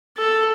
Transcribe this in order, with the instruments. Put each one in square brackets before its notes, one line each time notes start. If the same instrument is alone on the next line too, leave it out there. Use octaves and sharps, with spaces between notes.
[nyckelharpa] A4